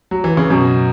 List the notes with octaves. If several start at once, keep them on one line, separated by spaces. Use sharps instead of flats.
F#3
E3
C#3
F#2 B2